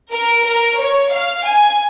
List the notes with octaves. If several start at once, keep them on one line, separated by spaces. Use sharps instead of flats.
A#4
A#4
C#5
F5
G#5